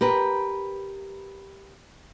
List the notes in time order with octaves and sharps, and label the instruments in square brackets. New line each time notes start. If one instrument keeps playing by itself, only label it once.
[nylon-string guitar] G4 A#4 B4